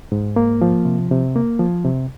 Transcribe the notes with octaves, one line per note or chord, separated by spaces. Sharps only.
G#2
A#3
F3
C3
C3
A#3
F3
C3